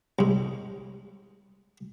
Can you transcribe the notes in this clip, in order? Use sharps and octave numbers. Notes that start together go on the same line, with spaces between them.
C2 G#2